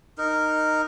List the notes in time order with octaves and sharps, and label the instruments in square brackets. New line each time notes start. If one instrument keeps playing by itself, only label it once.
[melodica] D#4 A#4